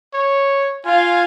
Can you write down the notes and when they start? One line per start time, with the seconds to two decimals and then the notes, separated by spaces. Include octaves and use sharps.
0.14 C#5
0.86 F4 F5 G#5